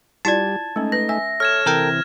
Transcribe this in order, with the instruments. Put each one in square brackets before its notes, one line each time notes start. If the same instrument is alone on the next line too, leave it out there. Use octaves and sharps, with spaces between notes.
[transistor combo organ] G3 [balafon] E4 F4 D5 [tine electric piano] A5 G#6
[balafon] G#3 C#4 [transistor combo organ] A3 D#4
[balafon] B4 [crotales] A#6
[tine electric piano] E5 [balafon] G#5
[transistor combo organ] A4 C#5 [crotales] F6 G#6 E7
[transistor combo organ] C3 E3 [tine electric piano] A4 A#4 G5